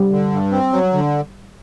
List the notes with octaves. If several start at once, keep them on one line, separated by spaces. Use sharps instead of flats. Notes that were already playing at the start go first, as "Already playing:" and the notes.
Already playing: G3
D3
G2
C4
F#3
D3